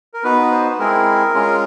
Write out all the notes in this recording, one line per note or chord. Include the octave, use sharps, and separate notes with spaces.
A#4
B3 D#4 F#4 B4
C5
G#3 C4 E4 G#4 A#4
G#3 C#4 F4 G#4